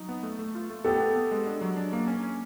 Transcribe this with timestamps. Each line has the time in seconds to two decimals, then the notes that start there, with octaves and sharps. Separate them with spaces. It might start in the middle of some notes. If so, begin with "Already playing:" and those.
Already playing: F#3 D#4
0.09 B3
0.23 A3
0.39 A3
0.55 F4
0.70 A3
0.85 B3 G4 A4
1.00 B3
1.16 B3
1.31 G#3
1.47 D4
1.61 F#3
1.77 D4
1.93 A#3
2.07 C#4
2.23 C#4